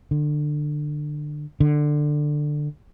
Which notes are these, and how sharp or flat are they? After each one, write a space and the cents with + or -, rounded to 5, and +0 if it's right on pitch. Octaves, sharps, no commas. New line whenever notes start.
D3 +20
D3 +15